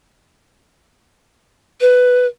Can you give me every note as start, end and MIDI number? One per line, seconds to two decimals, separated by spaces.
1.81 2.26 71